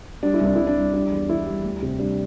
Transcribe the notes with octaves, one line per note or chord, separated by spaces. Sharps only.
G3 D4
E4
C2 D4
C2 E4
D4
G3
G3 D4
E2
E2 E4
G3
D2
C3
G3 D4